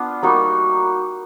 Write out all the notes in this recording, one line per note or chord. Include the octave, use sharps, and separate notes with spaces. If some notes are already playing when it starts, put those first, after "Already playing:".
Already playing: B3 D4 F4
G3 A#3 D#4 F#4